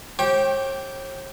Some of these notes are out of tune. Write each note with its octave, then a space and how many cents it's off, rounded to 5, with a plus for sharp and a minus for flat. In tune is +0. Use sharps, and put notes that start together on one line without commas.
G4 -15 C#5 -45 G5 +0